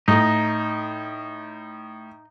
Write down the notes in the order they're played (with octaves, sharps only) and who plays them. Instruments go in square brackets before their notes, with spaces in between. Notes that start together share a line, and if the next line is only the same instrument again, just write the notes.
[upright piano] A2 [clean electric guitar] D#4